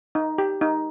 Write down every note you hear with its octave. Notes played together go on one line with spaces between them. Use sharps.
D#4
G4
D#4